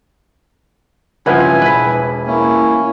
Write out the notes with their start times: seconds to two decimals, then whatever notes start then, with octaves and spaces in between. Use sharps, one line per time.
1.26 C#2 G2 F3 E4 B4 F#5 G#5
1.62 E1 B4 B6
2.27 A#3 C#4 E4